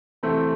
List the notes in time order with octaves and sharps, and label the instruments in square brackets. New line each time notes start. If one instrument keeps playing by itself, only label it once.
[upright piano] E2 C3 E3 A3 C4